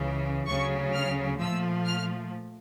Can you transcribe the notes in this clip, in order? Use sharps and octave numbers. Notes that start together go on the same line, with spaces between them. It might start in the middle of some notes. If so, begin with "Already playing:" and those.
Already playing: C#2 C#3 E3
D2 C#3 F#3 C#6
F6
A#2 F3 A3 E6
F6